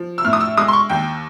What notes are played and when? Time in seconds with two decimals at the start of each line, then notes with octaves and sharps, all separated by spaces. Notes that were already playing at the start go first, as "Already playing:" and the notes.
Already playing: F3
0.18 E6
0.25 A2 F6
0.33 D#6
0.40 E6
0.57 G#3 D#6
0.68 C6
0.73 C#6
0.89 D#2 G5